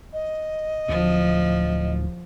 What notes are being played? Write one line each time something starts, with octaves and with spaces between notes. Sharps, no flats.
D#5
D1 F3